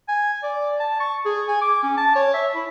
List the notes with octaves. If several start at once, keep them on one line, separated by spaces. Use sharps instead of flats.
G#5
D5
A5
C#6
G#4
G#5
D6
C#4
A5
C#5
E5
E4